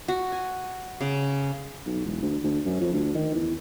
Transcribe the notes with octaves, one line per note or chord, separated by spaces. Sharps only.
F#4
G#5
C#3
B1
E1
D2
D2
F#2
F2
D2
D#3
E2